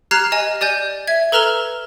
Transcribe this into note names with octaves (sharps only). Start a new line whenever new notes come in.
G4 A#5 F6 F#6 G#6 C7
G4 D#5 G#5
G4 D5 G#5 G6
E5 G#6
A4 B4 A#5 F6 E7 G7